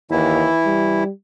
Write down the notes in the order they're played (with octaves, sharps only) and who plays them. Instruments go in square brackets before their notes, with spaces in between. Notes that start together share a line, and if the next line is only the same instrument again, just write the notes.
[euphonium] D#2 [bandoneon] E3 E4
[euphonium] G3